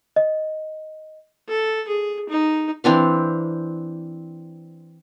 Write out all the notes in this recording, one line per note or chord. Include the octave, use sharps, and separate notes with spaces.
D#5
A4
G#4
D#4
E3 C4 D4 F5